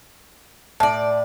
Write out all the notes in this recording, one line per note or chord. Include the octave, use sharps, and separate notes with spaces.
A2 D5 A5